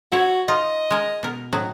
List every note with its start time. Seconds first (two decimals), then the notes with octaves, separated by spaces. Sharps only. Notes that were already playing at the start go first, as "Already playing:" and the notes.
0.12 E4 F#4 C#5
0.48 D#4 F4 D#5
0.90 G#3 A#4
1.23 B2 A#4
1.53 A2 F#3 D#4